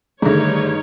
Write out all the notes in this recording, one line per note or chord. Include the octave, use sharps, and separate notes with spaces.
G2 D3 D#3 A3 D#4 G#4 C#5 E5